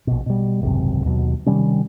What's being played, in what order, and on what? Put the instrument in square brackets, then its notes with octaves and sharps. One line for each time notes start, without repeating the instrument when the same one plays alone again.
[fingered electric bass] A#1 B2
B2 G3
G#1 C#2 F#2 C3
D#2 B2 F#3
C3 D#3 G3 C#4